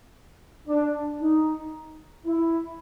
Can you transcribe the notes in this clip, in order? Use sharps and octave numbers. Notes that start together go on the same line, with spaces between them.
D4
D#4
E4